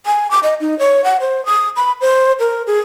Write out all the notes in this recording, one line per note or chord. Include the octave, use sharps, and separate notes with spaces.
G#5
D6
D#5
D#4
C#5
F#5
C5
D#6
B5
C5
A#4
G#4